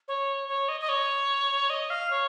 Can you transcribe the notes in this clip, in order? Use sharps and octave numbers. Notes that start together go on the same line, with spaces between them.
C#5
C#5
D#5
D#5
C#5
D#5
F5
C#5